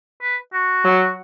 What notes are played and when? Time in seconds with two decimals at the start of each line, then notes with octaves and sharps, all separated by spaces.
0.22 B4
0.53 F#4
0.85 F#3